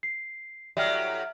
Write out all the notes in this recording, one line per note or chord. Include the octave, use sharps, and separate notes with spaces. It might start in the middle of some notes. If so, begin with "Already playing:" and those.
C7
A2 F#3 G3 E5 F6